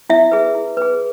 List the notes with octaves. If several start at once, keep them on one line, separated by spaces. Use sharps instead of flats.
E4 E5
G#4 B4
E4
G#4 B4